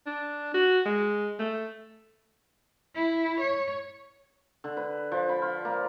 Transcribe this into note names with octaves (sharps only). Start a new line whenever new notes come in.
D4
F#4
G#3
A3
E4
C#5
D3
B4
F3
B5
F4
A#3